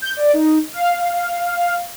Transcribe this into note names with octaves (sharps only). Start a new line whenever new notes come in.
G6
D5
D#4
F5